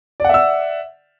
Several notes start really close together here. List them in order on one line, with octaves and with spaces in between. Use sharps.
D5 F#5 E5 E6